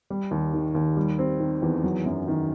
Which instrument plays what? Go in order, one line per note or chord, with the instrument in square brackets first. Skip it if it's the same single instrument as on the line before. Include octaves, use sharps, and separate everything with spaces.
[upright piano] G3
D#2
D#3
D#2
G3
C4
D#3
E2
F#3
F#2
D#3